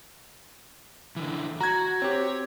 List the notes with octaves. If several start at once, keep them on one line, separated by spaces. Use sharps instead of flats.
D3 E3
F#4 A#5 G#6
C4 G4 C#5